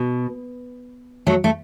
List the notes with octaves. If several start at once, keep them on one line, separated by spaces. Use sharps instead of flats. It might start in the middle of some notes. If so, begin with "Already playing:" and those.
Already playing: B2
F#3 A3
A3